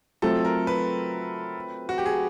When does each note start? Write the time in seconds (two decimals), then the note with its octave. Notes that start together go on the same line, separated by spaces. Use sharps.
0.22 F#3 A3 C4 F4 A4
0.45 A#4
0.67 B4
1.89 F#4
1.98 G4
2.06 G#4